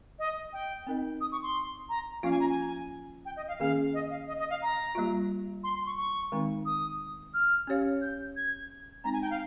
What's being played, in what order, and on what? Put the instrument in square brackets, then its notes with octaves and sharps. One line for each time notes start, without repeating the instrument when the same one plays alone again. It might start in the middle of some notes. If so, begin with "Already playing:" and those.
[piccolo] D#5
G5
[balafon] C4 D#4 A#4 D#5
[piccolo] D#6
C#6
C6
A#5
[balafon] F3 A#3 C#4 F4 [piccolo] F5
[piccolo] G#5
A#5
G#5
G5
D#5
F5
[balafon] D#3 A#3 C#4 G#4 [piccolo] F5
[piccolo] D#5
F5
D#5
D#5
F5
A#5
[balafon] G3 A#3 F4
[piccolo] C6
C6
C#6
C#6
[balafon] D#3 G#3 C4 D#4
[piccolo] D#6
F6
[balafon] C#4 G4 C#5 F5
[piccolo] G6
G#6
[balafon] G#3 C4 D#4 [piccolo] A#5
[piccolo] G#5
G5
F5